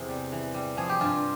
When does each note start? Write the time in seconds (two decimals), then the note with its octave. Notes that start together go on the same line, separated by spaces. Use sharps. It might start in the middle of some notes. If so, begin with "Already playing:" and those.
Already playing: E2 C3 G#4
0.08 G3
0.32 E3
0.54 G3
0.77 F3 G#4
0.89 G4
1.01 G2 F4